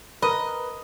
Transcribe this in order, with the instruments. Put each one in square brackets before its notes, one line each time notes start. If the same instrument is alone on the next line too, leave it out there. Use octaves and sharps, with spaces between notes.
[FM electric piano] A#4 B4 [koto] D#5